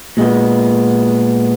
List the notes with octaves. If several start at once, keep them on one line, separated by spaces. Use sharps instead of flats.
A#2 G#3 B3